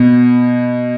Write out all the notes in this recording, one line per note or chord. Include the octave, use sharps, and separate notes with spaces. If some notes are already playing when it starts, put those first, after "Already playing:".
Already playing: B2